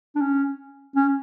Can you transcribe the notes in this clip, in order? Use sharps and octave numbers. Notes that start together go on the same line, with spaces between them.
D4
C#4
C#4